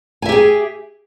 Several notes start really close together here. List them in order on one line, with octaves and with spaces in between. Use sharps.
G#5 E5 G4 G#4